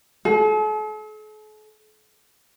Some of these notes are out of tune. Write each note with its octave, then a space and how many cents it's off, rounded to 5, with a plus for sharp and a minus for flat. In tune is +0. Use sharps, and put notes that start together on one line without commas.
A4 -45